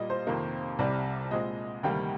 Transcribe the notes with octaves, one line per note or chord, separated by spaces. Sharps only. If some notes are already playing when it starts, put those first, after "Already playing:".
Already playing: A#2 G3 A#3 D5 D#5
C5
F2 C3 D#3 A#3
C2 C3 G3 D5
A#2 G#3 C4 D#5
D2 C3 D#3 G3 A#3 G5